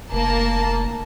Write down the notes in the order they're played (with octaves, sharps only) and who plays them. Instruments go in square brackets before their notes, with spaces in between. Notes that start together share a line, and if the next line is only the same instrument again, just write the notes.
[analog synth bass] F1 [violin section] A#3 A5